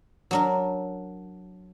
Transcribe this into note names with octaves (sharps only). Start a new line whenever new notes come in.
F#3 D4 A#4